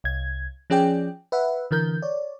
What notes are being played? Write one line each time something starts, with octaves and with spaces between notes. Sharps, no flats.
C2 G#6
F3 C#4 G#4 D5 G5
B4 E5 F#5
D3 E3 A#4 G6
C#5 D5